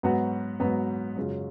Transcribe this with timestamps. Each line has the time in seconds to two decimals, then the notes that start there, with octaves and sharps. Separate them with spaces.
0.03 G#2 F#3 B3 F#4
0.60 G#2 F#3 B3 F#4
1.16 F#2 C#3 G#3 C#4 F4